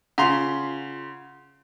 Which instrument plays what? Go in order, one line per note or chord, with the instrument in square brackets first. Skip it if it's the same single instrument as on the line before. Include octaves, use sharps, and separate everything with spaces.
[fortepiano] C#3 A#5 C6 [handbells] F4 F#5